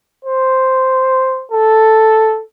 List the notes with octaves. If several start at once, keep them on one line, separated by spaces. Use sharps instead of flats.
C5
A4